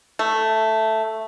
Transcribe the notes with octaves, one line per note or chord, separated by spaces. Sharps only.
A3